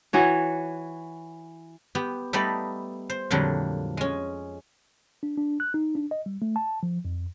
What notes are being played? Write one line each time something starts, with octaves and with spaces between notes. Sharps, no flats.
E3 F#4 C#5
B3 G4
G3 A3 B3 D#4 D5 B5
C5
F2 A#2 D3 F#3 G3
G#3 C#4
D4
D4
F#6
D#4
D4
D#5
G3
A3
A5
F3
F2